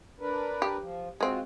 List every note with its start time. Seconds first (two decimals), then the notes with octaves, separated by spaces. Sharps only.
0.20 D4 A#4 B4
0.62 G4
0.80 F3
1.21 G#3 C4 F4 F#4